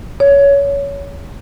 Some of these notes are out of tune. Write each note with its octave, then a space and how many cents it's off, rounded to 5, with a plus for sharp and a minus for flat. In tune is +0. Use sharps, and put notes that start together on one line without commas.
C#5 +20